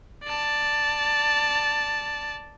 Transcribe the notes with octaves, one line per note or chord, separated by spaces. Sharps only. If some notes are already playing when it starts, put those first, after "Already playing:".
D5 A5